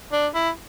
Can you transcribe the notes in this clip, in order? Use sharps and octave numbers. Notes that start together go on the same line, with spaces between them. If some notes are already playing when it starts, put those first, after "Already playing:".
D4
E4